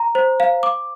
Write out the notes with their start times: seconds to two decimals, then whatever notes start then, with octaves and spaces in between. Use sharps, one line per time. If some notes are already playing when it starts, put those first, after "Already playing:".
Already playing: A#5
0.15 C5
0.40 F5
0.63 D6